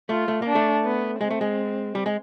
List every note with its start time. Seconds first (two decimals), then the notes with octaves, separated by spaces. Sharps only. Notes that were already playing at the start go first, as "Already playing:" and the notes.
0.09 A3 F4
0.28 A3
0.42 A#3 D4
0.55 A3
0.84 B3
1.20 G#3 C4
1.31 A3
1.41 G#3
1.95 G3
2.06 G#3